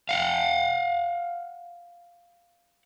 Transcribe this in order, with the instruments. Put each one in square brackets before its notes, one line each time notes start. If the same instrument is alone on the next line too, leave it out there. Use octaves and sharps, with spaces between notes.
[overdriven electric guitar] F5 F#5